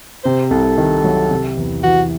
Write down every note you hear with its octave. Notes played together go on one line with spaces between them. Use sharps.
C3 C5
C2 A4
D#3
F#3
C3
E2
E3 F#4